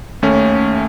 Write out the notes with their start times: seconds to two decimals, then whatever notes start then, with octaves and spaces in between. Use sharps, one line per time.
0.22 D#2 A3 C#4